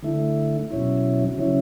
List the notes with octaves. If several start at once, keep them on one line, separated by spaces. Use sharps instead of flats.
D3 A3 E4
B2 F#3 C#4 E4
C#3 F#3 C#4 E4